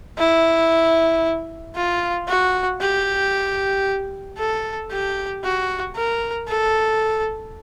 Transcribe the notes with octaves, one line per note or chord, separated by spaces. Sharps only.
E4
F4
F#4
G4
A4
G4
F#4
A#4
A4